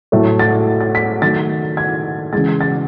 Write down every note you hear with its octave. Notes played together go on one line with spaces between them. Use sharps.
A2 F#3 A3
A6
A6
B6
D#3 F#3 A3 A6
G#6
C#3 E3 G#3 A6
A6